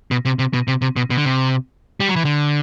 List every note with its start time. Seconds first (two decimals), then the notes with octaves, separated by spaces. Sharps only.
0.11 B2
0.25 C3
0.39 C3
0.53 B2
0.68 C3
0.82 C3
0.96 B2
1.10 B2
1.17 D3
1.25 C3
2.00 G3
2.09 F#3
2.16 E3
2.25 D3